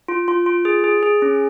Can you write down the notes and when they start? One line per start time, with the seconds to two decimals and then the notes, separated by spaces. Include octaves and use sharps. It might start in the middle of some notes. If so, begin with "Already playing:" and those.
0.08 F4
0.28 F4
0.46 F4
0.65 G#4
0.84 G#4
1.03 G#4
1.22 C#4